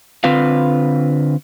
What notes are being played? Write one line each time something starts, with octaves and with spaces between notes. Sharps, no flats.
D3 C4 F4 B4 F5